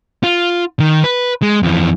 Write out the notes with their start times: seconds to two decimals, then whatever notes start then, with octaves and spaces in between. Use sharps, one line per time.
0.24 F4
0.80 D#3
1.04 B4
1.42 G#3
1.63 F2 E3